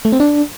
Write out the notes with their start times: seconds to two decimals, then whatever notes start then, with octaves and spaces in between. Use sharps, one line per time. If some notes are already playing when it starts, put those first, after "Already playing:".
0.05 A3
0.12 C4
0.20 D4